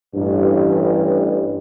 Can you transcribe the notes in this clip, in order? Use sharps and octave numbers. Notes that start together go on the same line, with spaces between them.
A1 G2